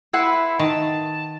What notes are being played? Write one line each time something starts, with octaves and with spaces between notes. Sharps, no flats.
E4 B4 F#5 C6
D#3 A5